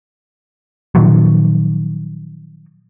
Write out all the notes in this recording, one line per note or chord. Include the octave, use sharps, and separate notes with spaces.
A#2 D#3 F3 F#3